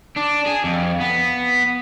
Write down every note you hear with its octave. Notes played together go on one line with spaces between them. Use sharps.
D4
G#4
F2
B3